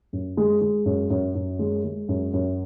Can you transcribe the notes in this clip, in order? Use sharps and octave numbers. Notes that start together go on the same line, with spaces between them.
F#2
G#3
G#3
F#2
F#2
F#2
G#3
G#3
F#2
F#2